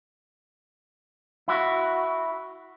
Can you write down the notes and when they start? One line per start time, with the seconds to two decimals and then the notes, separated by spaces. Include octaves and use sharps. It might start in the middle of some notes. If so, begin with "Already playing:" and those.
1.48 E4 F#4